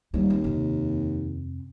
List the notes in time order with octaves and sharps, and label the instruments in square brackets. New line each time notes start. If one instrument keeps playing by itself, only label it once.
[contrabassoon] D#2 [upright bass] G3 G#3
[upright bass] C4
F2 C3